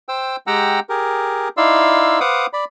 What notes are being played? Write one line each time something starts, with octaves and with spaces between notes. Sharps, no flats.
C5 G5 E6
G#3 G4 F#5 G5 A#5 E6
G4 G#4 A#4
D#4 E4 D5 F5 C6 E6
B4 C5 F5 F#5 D6 D#6
D5 B5